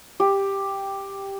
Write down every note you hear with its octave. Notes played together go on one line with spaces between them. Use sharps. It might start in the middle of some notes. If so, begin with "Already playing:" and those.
G4